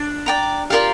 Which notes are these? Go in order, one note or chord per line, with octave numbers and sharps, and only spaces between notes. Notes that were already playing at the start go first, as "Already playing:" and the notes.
Already playing: D4
D5 G5 A#5
F4 G4 A#4 D5 F5